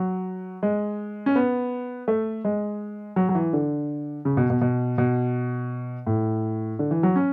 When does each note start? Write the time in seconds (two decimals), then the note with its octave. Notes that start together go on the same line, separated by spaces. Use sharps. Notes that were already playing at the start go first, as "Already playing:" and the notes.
Already playing: F#3
0.63 G#3
1.26 C#4
1.36 B3
2.08 A3
2.45 G#3
3.16 F#3
3.29 F#3
3.35 E3
3.53 D3
4.25 C#3
4.37 B2
4.50 B2
4.61 B2
4.98 B2
6.07 A2
6.79 D3
6.91 E3
7.03 F#3
7.16 C#4